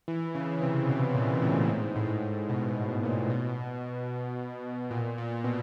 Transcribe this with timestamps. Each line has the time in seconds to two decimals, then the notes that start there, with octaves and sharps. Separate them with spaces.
0.08 E3
0.35 C#3
0.62 C3
0.89 B2
1.14 A#2
1.42 A2
1.69 G#2
1.95 A2
2.04 G#2
2.12 A2
2.49 B2
2.76 B2
3.03 A#2
3.30 B2
4.91 A#2
5.18 A#2
5.44 B2